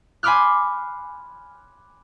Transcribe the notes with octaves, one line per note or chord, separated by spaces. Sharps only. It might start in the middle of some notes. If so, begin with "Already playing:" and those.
G#5 B5 C6 D6 F6 F#6